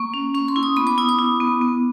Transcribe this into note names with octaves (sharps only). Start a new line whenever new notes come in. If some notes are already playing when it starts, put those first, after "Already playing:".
Already playing: A#3 C#6
C#4
C#4 C#6
C6
E4
D#6
B3 B5
D6
E4 D#6
D6
E4
B3
B3